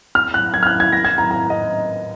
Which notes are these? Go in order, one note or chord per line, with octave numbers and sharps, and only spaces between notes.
F6
F#6
G#6
F6
F#6
G#6
A#6
G#6
A#5
A#5
D#5